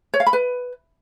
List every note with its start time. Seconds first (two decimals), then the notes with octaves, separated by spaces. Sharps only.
0.14 C#5
0.20 F5
0.27 B5
0.33 B4